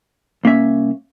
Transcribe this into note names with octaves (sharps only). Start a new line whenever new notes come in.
C2 A#3 C#4 E5